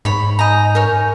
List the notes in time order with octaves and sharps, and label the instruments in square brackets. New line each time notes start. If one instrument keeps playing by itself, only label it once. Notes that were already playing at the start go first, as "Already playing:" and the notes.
[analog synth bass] G#2 [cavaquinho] C#5 B5
[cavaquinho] D#5 A#5 [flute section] G#5 G6
[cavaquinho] A#4 C#5